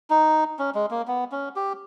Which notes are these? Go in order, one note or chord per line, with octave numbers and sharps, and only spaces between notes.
D#4
C#4
G#3
A#3
B3
C#4
G4